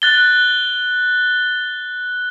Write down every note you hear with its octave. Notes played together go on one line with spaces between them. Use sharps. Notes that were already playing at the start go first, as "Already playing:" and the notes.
F#6 A6 G7